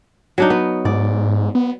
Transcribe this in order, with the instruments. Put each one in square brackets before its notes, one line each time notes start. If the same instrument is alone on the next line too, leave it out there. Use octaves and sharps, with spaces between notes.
[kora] F#3 D4 D#4
B3
[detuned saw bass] G#2 [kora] D5
[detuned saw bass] B3